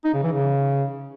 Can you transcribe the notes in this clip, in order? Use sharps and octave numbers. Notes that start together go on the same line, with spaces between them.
D#4
C#3
E3
C#3